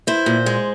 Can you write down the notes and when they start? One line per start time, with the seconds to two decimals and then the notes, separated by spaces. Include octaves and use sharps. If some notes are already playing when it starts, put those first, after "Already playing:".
0.07 E4 C5
0.26 A#2
0.46 G#3